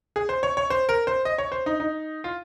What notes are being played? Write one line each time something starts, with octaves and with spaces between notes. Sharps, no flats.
G#4
C5
C#5
C#5
C5
A#4
C5
D#5
C#5
C5
D#4
D#4
F4